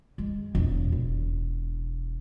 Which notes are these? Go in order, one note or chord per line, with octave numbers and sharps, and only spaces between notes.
G#3
E1
E1